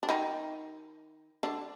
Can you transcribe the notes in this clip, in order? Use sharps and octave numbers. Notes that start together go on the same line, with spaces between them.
D4
D#3 D#4
D3 D4